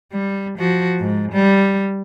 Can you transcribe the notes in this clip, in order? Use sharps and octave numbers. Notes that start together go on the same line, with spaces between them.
G3
F3 F#4
G#2
G3